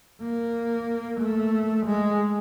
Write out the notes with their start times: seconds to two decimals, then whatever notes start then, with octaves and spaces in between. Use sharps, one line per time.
0.22 A#3
1.20 A3
1.86 G#3